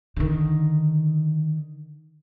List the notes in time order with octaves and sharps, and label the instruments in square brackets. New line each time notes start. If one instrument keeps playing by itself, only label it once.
[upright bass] D3 D#3